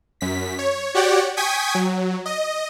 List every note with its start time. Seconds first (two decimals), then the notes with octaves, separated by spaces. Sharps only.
0.21 F#2 B6
0.59 C#5
0.94 F#4 G4 C#5 D5 F#5 G5
1.37 G5 G#5 C#6 D#6 G#6 B6
1.75 F#3
2.26 D#5